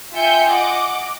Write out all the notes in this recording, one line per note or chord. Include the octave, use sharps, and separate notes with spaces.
F4 E5 G5 G#5 G6 C#7
D#5 F#5 D6